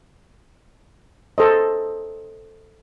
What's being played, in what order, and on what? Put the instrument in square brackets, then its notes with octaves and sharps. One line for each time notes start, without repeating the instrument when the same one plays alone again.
[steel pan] A4 C5 D#5